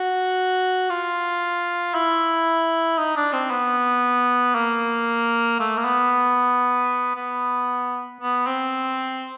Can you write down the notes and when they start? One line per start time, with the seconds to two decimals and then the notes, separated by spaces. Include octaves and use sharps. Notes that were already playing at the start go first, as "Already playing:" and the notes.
Already playing: F#4
0.90 F4
1.94 E4
2.98 D#4
3.16 D4
3.33 C4
3.50 B3
4.55 A#3
5.60 A3
5.77 A#3
5.85 B3
7.16 B3
8.21 B3
8.47 C4